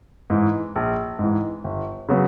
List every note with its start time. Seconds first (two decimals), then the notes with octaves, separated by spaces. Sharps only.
0.30 G#2 E3
0.75 A#1
1.19 G#2 E3
1.64 G1
2.08 C#3 F#3 B3